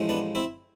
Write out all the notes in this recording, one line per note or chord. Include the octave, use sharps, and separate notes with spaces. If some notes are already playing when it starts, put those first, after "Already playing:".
Already playing: A1 A2 F3 G#3
B3 D4
C4 E4